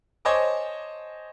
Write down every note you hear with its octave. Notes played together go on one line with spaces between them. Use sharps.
C5 C#5 D#5 G#5 A5 D6